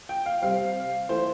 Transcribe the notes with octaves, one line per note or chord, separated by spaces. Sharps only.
G5
F5
C3 G3 C4 F5
E3 A3 C5